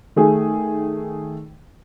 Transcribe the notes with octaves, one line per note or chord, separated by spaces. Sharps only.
D#3 A3 G#4